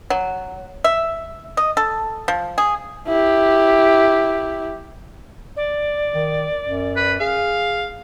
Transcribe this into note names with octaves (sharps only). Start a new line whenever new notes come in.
F#3
E5
D#5
A4
F3
G#4
E4 G4
D5
D#3
F#2
B4
G#4 F5